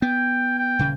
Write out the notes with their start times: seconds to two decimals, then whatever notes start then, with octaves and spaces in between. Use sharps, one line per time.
0.02 B3 G5
0.58 G5
0.79 D#1 C#3